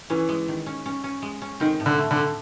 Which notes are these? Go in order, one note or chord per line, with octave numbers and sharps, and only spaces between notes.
E3 C#4
G#3
D#3
C#4
C#4
C#4
G#3
C#4
D#3 C4
A2
D3
A3
D3
A3